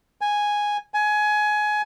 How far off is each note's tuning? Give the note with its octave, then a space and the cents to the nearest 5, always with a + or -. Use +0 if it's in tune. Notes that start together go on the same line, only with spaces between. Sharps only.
G#5 -5
G#5 +20